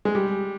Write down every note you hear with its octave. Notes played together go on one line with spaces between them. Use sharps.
G#3
G3